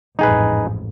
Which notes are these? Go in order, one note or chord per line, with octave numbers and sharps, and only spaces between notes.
A1 F2 G#2 D#4 G#4 B4